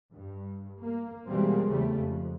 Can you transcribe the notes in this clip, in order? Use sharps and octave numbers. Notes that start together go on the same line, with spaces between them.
G2
A#3
B2 E3 G3 G#3 A#3 C4
E2 C#3 G3 A3
F2